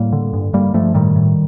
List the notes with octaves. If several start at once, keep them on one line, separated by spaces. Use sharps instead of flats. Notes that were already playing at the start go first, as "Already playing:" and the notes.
Already playing: A2 G3 A#3
D3
G2
G2 G3 A#3
G2 F3 A3
A2 D#3 G3
A2